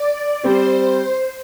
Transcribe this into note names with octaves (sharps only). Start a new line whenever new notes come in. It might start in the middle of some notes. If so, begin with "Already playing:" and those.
Already playing: D5
G3 C4 G4 C5